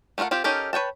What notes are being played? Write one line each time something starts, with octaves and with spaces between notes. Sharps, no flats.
A3 C#4 F4 A#4 F#5
C4 F4 G4
C#4 D#4 G4 A4 A#4
B4 C#5 G5 A5